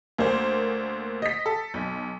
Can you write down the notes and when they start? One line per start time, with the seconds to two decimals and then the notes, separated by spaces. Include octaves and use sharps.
0.18 D2 A#3 C5
1.22 D#5 B6
1.46 A4
1.74 B1